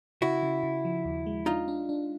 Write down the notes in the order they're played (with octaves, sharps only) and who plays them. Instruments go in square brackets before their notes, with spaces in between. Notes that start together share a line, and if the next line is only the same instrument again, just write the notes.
[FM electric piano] C#3 [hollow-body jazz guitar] E4 F#4
[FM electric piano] C#3
C#3
F3
D#2
G#3
[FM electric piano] D4 [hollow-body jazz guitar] D#4 F4
[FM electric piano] D4
D4